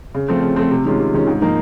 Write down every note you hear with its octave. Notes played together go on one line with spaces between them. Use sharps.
C#3
F3 A3 C4
C#3
F3 A3 C4
C3
D#3 G#3 C#4 F4
C3
D#3 G#3 C#4 F4
G#2
F3 A#3 D#4